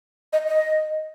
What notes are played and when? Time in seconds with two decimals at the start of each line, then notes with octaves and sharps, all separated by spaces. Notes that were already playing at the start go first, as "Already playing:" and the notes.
0.33 D#5
0.48 D#5